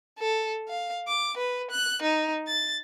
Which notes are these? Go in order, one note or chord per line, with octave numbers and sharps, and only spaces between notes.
A4
F5
D6
B4
F#6
D#4
A6